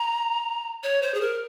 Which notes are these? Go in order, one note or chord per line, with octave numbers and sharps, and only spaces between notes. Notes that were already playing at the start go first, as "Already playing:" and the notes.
Already playing: A#5
C#5
C5
G#4
A#4